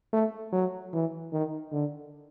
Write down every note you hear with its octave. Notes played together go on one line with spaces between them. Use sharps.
A3
F#3
E3
D#3
D3